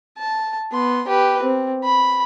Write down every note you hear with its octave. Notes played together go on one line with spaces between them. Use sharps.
A5
B3 C6
G4 B4
C4
B5